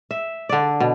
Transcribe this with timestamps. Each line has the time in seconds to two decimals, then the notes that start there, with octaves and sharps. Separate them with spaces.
0.11 E5
0.49 D3 D5
0.80 B2